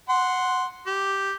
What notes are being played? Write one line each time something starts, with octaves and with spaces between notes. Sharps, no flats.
F#5 C6
G4